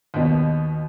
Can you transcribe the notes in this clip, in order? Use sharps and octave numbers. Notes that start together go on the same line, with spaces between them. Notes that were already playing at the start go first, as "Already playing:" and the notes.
D#2 B2